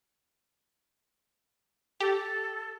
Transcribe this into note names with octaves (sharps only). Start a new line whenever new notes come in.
G4 A4